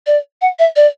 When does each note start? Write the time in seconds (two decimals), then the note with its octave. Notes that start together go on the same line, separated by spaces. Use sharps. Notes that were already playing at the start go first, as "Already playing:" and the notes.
0.07 D5
0.41 F#5
0.59 E5
0.76 D5